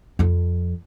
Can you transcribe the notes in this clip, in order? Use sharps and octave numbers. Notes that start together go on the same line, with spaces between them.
F2 F3